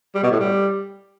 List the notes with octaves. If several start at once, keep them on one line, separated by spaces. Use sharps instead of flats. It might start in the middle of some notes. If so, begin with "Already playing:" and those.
G3
B2
A2
G3